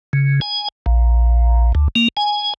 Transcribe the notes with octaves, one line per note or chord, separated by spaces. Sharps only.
C#3
G#5
A#1
D2
A#3
G#5